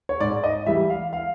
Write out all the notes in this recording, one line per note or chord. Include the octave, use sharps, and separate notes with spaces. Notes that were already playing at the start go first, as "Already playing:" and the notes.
C#5
G#2 D5
D#5
E3 G3 E5
F5
F5